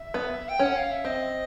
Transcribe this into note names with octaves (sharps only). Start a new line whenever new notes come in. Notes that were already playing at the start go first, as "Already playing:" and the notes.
Already playing: E5
B3
G5
C#4 F#5
F5
E5
C4 D#5